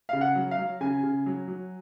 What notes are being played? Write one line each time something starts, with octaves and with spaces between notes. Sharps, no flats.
C#3 F5
F#5
F#3
F5
F#3
C#3 G#5
C#3
F#3
F#3